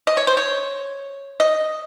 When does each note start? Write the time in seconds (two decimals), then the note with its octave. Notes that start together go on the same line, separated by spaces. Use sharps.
0.07 D#5
0.17 C#5
0.27 C5
0.37 C#5
1.40 D#5